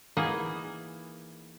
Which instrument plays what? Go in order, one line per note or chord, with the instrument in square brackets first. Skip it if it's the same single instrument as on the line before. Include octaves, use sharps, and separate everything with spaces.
[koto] E3 A#3 B3 D#4 G#4